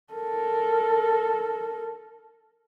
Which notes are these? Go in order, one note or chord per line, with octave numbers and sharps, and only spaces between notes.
A4 A#4